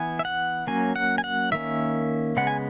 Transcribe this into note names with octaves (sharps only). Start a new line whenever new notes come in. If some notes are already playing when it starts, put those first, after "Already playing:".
Already playing: E3 B3 G#5
E5
F#5
F#3 A#3 C#4 G#5
F#5
G#5
F#5
D#3 A#3 C#4 E5
C#3 G#3 B3 F#5
G#5